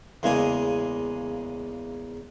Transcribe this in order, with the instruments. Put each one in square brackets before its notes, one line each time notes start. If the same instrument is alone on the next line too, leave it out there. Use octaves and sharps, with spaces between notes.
[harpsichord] E2 C#3 G#3 A#3 G#5 D#6